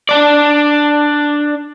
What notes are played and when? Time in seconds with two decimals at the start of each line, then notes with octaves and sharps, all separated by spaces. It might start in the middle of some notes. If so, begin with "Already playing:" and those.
0.09 D4 D5